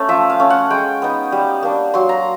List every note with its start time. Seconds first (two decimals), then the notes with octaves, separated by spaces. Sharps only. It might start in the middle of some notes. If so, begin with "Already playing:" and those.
Already playing: A3 C#4
0.09 F3 E5
0.30 F5
0.40 A3 C#4
0.50 F#5
0.70 G#3 G5
1.02 B3 D#4
1.32 G3
1.63 A#3 D4
1.94 F#3 C6
2.09 A#5